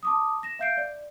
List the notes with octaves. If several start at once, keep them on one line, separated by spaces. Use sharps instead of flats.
A5 D6 D#6
A#6 E7
E5 F5 G6 C7 D7
D5